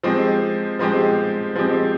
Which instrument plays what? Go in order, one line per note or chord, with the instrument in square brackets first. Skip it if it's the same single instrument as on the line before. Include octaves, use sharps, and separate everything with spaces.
[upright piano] F3 G#3 C4 G4
F3 G#3 C4 G4
F3 G#3 C4 G4